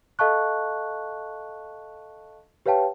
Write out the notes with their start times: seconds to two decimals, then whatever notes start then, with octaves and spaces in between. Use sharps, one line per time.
0.19 A4 D#5 F5 A5 C#6 F#6
2.66 G4 B4 C#5 F5 G5 A5